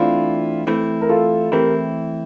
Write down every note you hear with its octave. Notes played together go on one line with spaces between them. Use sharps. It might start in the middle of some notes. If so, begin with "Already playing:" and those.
Already playing: E3 A3 C4 D4 E4 F4
E3 A3 C4 E4
A#4
F4 A4
E3 A3 C4 E4 G4 A#4